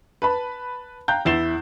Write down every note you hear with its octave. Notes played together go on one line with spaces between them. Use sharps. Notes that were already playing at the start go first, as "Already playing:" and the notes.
B4 A5 B5
F5 G5 A#5 F#6 G6
E2 E4 A6 C7 E7 G7